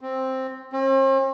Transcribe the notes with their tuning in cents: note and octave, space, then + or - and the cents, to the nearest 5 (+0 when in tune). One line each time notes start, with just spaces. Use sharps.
C4 +5
C4 +45